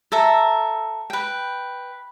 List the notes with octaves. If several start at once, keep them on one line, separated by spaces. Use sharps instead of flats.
A4 E5 A#5
B4 G5